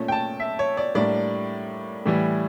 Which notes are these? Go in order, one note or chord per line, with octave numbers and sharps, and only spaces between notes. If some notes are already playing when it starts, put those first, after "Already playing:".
Already playing: A#2 A3 C#4
G5
A5
E5
C#5
D5
A2 G3 A#3 D4 D5
A2 E3 G3